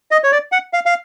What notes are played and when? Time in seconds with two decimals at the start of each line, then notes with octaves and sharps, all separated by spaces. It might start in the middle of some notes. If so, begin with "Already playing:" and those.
0.11 D#5
0.24 C#5
0.32 D5
0.52 F#5
0.73 F5
0.86 F5